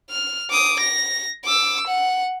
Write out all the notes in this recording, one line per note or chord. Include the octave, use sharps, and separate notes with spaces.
F6
D6 D#6
A#6
D6 E6
F#5